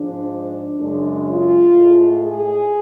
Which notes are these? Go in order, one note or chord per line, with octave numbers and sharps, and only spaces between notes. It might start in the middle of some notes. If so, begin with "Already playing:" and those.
Already playing: G#2 F3 G#3 D4
F#2 C#3 G#3 D4
F4
A2 G#3
G#4